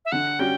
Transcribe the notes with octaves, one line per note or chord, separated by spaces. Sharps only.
E5
D3 F#5
G3 C#4 F#4 G5